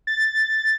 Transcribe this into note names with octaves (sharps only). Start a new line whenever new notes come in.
A6